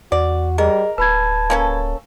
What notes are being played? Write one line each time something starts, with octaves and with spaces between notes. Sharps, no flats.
E2 F#4 D5
G3 G#4 A#4 D#5
D1 B4 A5 B5 G#6
A#3 C#4 A4